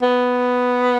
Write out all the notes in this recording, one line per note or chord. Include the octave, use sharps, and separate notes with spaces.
B3